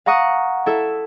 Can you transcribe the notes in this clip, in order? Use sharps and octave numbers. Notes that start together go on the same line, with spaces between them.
F5 F#5 A#5 C#6 D#6 F#6
E4 A4 E5